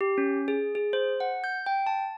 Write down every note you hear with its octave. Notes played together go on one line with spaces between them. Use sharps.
G4
C#4
G#4
G#4
C5
F#5
G6
G5
A5